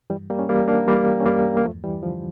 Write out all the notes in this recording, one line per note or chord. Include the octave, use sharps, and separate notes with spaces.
G2 E3 G3
G3 A#3
C#4
E3 G3 A#3
A#3 D4
E3 G3 A#3
C#4
G2 G3 A#3
A#3
E2 F3 A3
E3 G3
D3 F3